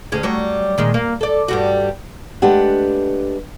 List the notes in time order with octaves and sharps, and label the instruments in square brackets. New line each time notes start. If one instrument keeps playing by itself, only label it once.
[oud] D2 C#4 G#4
F#3 G3 C#5
A#2 D#3 G#3
A#3
A4 D5
G2 G3 F#4
[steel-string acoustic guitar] G#3 A3 D4 G4 B4 F#5